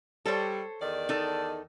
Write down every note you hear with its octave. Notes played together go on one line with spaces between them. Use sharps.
G3 A4 C5 C#5
E2 D#3 D5
D#4 A4